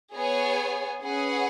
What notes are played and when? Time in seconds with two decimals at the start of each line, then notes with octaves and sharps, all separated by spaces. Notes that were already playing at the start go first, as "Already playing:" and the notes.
0.15 B3 G#4 C#5 G#5
1.03 C#4 G#4 B4 F#5